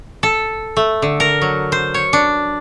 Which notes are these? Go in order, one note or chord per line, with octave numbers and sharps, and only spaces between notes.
A4
A3
D3
A#4
F#3
C5
C#5
D4